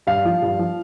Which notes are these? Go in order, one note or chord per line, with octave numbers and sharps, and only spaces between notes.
G2 F5
F3
G2
F3